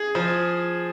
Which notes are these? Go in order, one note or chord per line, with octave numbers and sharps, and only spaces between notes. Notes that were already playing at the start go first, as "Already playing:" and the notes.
Already playing: G#4
F3